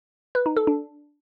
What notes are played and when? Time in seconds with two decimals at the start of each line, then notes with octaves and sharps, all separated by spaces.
0.35 B4
0.46 D#4
0.57 A4
0.67 D4